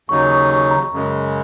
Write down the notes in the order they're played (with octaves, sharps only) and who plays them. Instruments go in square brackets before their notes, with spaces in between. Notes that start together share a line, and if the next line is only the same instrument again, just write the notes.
[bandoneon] D#2 C#3 F#3 D#4 [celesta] C#6
[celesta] C#6
C#6
A#5
[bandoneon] F#2 C#3 G#3